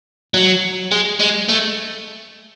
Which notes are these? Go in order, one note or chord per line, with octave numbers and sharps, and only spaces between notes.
F#3
G#3
G#3
A3